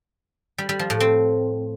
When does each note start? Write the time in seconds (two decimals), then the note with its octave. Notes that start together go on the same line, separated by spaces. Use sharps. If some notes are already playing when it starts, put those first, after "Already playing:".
0.58 G3
0.69 G3
0.79 F3
0.90 A2
1.00 C4